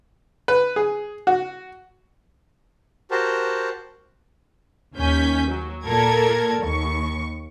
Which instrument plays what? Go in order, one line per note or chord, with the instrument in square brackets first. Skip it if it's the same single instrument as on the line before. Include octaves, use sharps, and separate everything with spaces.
[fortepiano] B4
G#4
F#4
[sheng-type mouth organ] F#4 G4 A#4 C5 A5
[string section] D#2 C#4 G#5 G6 B6
F#3
A#2 A4 A#4 G#6
D#2 C#6